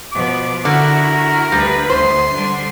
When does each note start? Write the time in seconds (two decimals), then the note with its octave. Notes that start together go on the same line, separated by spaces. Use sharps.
0.12 B2 F3 D6
0.65 D3 E4 F#4 A#4
1.52 D2 G3 B4
1.90 D2 C5 C6
2.34 D3 G3